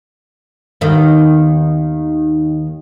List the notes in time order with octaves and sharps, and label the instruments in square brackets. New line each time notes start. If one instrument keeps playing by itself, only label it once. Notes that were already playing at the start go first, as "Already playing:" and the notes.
[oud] D#2 D#3 B3